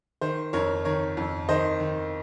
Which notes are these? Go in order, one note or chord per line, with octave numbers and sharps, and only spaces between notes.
D#3 C5
F2 A#4 C#5
D#3 A#4 C#5
F2
D#3 C5 D#5
D#3